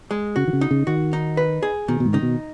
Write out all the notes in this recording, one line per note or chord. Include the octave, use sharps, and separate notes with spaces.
G#3
C#3 F#4
D#3
C#3
D#4
C#3
D#3 F#4
D#4
B4
G#4
B2 D#3
B2
G#2
C#3 D#4
B2